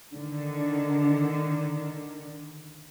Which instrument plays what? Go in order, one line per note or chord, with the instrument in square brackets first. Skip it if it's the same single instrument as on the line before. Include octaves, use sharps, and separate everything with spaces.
[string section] D3 D#3